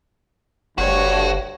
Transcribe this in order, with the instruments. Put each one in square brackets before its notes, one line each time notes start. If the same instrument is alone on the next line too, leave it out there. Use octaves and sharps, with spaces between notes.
[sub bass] F#1 [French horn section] D2 G2 [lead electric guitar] F#4 [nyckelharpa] C#5